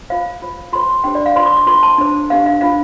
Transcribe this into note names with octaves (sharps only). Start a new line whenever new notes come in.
F4 C5 F5
F4 C5
F4 A4 C5 C6
D4 G4 C5 G5
D5
F5
F4 C5 C6
D6
D6
F4 A4 C5 C6
A5
D4 A4 C5
D4 G4 C5 F5
F5
D4 F4 C5 F5